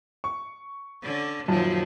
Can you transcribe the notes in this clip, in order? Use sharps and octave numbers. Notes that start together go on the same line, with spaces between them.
C#6
D3 C#4
F#2 A#2 D#3 F3 F#3 A5